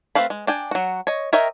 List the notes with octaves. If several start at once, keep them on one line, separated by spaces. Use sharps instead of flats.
A3 C4 B4 F5 B5
G#3
D4 G5 G#5
F#3 F#4
C#5 D#5
A#4 C#5 D#5 E5 G5